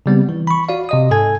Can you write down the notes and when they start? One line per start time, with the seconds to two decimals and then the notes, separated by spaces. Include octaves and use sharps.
0.06 C#3 G3 B3 C4
0.29 E3
0.47 B5 C#6
0.69 F#4 D5 F5
0.89 C3 D#5 D#6
1.11 G#2 A4 G#5 G#6